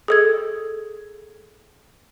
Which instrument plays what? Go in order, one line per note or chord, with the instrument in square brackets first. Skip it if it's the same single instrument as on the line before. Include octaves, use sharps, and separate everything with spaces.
[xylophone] G#4 A4 G#6